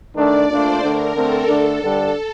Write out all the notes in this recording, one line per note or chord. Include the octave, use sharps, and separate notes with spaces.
D#3 A3 D4 D5
A#2 A3 D4 F4 C5
D3 A3 D4 A#4
D3 A3 C4 A4
D3 A3 D4
G2 D3 G3 D4 A4